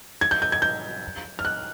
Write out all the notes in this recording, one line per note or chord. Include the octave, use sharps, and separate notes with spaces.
G#6
G6
G6
G#6
G6
F6
F#6